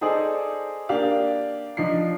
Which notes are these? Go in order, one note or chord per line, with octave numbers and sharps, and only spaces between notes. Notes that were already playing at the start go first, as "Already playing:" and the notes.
D#4 G#4 A4 C5 D5
A#3 D4 G4 D5 F5
F3 D4 D#4 C7